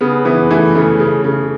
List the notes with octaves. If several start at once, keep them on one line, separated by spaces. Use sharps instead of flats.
C#3 B3
E3 B3
E3 A3
C#3 A3
C#3
C#3